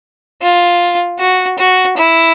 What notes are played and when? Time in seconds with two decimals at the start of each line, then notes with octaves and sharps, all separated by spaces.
0.42 F4
1.19 F#4
1.58 F#4
1.97 E4